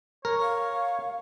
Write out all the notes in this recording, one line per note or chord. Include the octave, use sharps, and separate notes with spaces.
A#4 C#5
F5